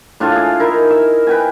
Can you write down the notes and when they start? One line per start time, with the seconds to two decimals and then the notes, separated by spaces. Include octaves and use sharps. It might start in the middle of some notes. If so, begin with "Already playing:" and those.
0.20 A2 D4 F4 F5
0.36 G#4
0.60 D#4 E4 A#4
0.90 E5
1.27 B4 G5 G#5